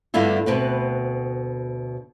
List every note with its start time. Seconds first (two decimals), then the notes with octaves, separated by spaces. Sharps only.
0.14 G2 D3 B3 E4 F4
0.46 D2 B2 C4 B4